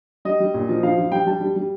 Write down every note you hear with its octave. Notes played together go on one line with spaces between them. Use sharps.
G3 D#5
G3
A#2
F3
F3 F5
F3
G3 G5
G3 A5
G3
G3